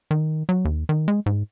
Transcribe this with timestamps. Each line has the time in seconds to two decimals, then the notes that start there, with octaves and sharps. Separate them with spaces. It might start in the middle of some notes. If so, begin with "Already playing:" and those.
0.11 D#3
0.49 F#3
0.65 D#2
0.89 D#3
1.08 G#3
1.26 G#2